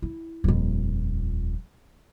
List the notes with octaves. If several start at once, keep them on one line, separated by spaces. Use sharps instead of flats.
E4
D#1 F2